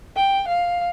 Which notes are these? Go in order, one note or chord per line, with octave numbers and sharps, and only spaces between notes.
G5
F5